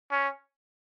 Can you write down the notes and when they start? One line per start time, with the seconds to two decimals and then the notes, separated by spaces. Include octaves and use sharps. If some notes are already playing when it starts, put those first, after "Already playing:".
0.12 C#4